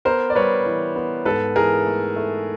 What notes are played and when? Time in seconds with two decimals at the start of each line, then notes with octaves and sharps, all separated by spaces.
0.05 B3 A#4 C5
0.30 D5
0.35 G3 B4 C#5
0.66 E3
0.96 B3
1.25 G#2 A4 B4
1.56 E3 G#4 A#4
1.86 A3
2.16 A3